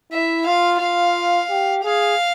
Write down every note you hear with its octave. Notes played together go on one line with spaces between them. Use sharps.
E4 E5
F4 F5
F4 F5
G4
G#4 F5